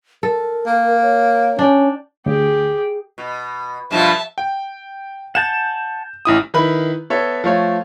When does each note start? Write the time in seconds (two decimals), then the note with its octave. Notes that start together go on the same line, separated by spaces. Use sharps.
0.23 A4 A#4
0.66 A#3
1.02 C#5
1.59 C#4 D4 G5
2.26 D2 G4 G#4
3.18 B2
3.91 G2 B2 F3 E5 A5
4.38 G5
5.35 F#5 G#5 A5 G6 E7
6.25 A1 E4 D#6
6.54 D#3 E4 B4 B5
7.10 B3 A4 C#5 E5
7.44 F3 A3 C#5